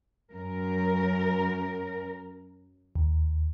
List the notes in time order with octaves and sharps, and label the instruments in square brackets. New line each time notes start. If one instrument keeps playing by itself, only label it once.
[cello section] F#2 A#4
[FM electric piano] D#2